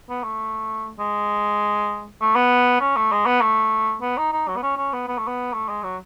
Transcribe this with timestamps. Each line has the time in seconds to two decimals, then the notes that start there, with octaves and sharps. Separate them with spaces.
0.09 B3
0.24 A3
0.99 G#3
2.21 A3
2.35 B3
2.81 C#4
2.97 A3
3.12 G#3
3.26 B3
3.41 A3
4.02 B3
4.17 D#4
4.32 D#4
4.48 F#3
4.56 B3
4.63 C#4
4.77 C#4
4.93 B3
5.08 B3
5.18 A3
5.27 B3
5.53 A3
5.69 G#3
5.83 F#3